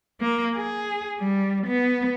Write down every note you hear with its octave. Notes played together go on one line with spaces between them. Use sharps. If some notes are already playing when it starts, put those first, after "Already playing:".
A#3
G#4
G3
B3